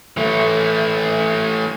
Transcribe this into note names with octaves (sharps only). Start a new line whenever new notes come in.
E3 A3